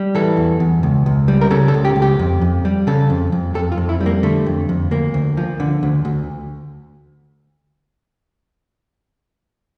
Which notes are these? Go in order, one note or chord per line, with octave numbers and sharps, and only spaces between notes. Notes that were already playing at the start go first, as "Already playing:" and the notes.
Already playing: G3
E3 A4
E2
E2
C#2
C#2
G3
A#4
C#3 A4
A4
C#2
G4
C#2
G4
F2
F2
G3
C#3 A4
F2
F2
F2 A4
F4
F2
E4
G3
A#3
D3 A3
F2
F2
D2 A#3
D2
F3
D3
D2
D2